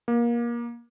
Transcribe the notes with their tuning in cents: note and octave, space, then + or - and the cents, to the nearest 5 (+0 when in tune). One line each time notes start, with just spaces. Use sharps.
A#3 +25